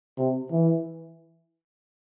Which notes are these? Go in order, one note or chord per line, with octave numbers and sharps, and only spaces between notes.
C3
E3